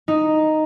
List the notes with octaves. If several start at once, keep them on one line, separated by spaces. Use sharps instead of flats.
D#4